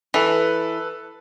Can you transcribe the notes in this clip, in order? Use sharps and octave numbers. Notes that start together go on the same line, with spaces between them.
E3 A4 B4